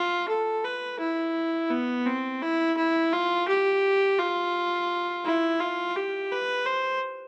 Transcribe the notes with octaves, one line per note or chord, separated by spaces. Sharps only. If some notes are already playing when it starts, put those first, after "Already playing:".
Already playing: F4
A4
B4
E4
B3
C4
E4
E4
F4
G4
F4
E4
F4
G4
B4
C5